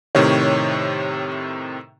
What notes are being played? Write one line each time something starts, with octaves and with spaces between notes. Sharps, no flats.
A2 C3 D#3 C#5